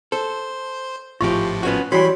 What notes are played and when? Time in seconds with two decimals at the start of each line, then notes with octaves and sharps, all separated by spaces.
0.12 A4 C5
1.21 G#1 A2 F3 F4 G4 C#6
1.63 B3 C#4 F#4
1.92 E3 F#3 G3 F#4 C#5 G#5 B5 C6